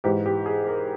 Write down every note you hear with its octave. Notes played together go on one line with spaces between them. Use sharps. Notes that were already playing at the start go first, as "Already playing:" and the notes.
G#2 E3 G4
G4
G#4
A#4